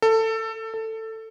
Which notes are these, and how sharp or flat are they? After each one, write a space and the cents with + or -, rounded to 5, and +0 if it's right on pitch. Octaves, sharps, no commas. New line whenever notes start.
A4 +20
A4 +15